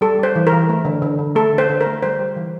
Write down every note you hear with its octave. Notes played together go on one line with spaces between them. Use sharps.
G3 A4
G3 C5
E3
A#4
E3
A3
D3
D3
D3
A3 A4
D3
C5
D3
A#4
A3
G3 C5
G3
E3